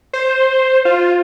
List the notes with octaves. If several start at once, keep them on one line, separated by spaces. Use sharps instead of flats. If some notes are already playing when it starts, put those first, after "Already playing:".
C5
F4